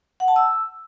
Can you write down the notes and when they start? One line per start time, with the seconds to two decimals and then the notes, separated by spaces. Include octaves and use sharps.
0.20 F#5
0.28 A5
0.36 E6